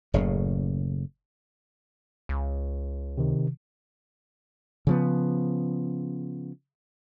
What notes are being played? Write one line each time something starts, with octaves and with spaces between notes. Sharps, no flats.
F#1 A2 C#3
C#2
C3 D#3
C#3 F3 B3